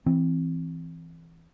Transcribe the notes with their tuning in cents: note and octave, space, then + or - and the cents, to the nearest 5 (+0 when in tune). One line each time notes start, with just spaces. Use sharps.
E3 +0 C4 +0